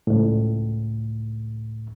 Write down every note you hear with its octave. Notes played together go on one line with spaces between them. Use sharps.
C#2 A2